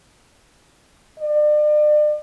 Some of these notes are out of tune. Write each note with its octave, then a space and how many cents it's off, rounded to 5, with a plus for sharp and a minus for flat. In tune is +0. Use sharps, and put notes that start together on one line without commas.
D5 +40